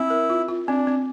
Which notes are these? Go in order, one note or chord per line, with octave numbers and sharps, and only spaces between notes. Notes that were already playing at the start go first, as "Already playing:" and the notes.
Already playing: C4 E4
A#4
F4
F4
C4 D4
C4